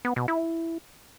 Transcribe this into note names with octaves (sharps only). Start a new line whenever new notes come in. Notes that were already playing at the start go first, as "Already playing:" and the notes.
B3
B2
E4